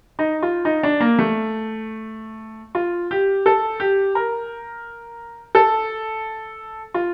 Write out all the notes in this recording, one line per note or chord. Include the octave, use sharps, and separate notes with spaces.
D#4
F4
D#4
D4
A#3
A3
F4
G4
A4
G4
A#4
A4
F4